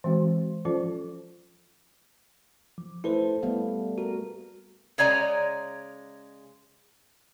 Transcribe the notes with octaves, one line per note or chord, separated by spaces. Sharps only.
E3 G#3 C4 F#4
F3 C#4 F4 A4 C5
F3
A3 E4 A4 B4 C5
G3 A3 B3 F5
F#4 A#4
C#3 G#3 C#5 D5 G#5 A#5